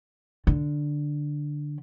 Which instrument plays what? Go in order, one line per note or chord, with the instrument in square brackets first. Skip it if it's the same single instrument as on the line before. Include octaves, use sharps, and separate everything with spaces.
[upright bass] D3